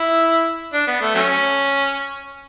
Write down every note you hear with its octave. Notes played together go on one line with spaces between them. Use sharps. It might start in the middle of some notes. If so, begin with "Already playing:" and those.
Already playing: E4
D4
B3
A3
F#3 A3 C#4